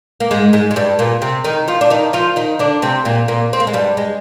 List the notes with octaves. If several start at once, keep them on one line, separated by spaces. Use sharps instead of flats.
A#3
G#2 G#3
G#2 G#3
G#3
G2 G3
A#2 A#3
C3 C4
D#3 D#4
F3 F4
D4
D#3 D#4
F3 F4
D#3 D#4
D3 D4
C3 C4
A#2 A#3
A#2 A#3
C4
A#3
G#3
G2 G3
G#3